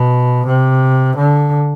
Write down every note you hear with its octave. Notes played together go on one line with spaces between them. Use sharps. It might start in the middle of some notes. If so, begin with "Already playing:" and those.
Already playing: B2
C3
D3